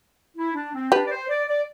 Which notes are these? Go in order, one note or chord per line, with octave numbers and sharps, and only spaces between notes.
E4
D4
C4
D4 G4 B4
D5
C5
D5
D5